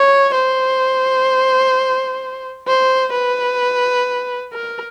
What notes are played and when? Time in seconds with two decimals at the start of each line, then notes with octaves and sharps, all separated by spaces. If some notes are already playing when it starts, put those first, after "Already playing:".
Already playing: C#5
0.34 C5
2.67 C5
3.13 B4
4.53 A#4